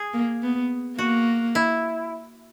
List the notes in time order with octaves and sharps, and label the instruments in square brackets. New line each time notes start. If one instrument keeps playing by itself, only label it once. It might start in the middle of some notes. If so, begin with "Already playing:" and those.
Already playing: [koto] G#4
[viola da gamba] A#3
B3
[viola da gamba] A#3 [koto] F#4
[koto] E4